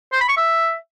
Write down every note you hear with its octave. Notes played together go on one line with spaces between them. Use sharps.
C5
B5
C#6
E5